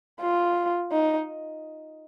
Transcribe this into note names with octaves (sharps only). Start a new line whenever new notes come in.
F4
D#4